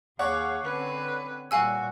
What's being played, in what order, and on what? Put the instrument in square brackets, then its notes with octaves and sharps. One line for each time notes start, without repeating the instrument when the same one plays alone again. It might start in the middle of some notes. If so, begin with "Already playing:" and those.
[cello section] D#2 G#4 F5 [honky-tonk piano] C#5 F#5 D6
[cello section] D3 C4 C#4 [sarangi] B4
[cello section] A#2 G3 [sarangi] F#4 [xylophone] F5 G#5 E6